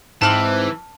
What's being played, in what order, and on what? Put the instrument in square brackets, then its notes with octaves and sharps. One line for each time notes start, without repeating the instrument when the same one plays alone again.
[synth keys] G#2 C4 D6 [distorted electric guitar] E3 [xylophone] A5 F6 F#7